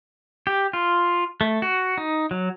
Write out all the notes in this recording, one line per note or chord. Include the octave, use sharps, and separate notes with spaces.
G4
F4
A3
F#4
D#4
F#3